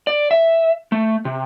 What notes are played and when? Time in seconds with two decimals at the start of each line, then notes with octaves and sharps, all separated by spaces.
0.07 D5
0.31 E5
0.92 A3
1.25 C3